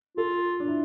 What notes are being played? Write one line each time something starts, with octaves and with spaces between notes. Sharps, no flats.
F4 A4
D4
E4